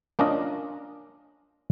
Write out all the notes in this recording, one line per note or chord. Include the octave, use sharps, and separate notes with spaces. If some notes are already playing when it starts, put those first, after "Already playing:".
A#3 C#4 D4 F4 D#5